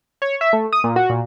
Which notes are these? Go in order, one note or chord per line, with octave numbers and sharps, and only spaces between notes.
C#5
E5
A3
D#6
A#2
F#4
A#2